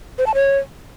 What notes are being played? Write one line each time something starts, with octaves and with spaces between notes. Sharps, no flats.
C5
A5
C#5